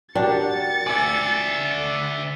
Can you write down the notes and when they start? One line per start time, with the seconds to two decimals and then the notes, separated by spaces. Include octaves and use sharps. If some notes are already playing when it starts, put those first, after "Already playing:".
0.15 D4 F#4 G4 A#4 A6 C#7
0.87 D5 E5 G#5